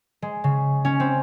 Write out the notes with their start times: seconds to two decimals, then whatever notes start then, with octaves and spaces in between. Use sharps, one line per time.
0.22 G#3
0.44 C#3
0.85 C#4
1.00 C4